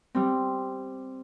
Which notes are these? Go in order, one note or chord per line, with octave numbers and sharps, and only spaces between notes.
G3 C4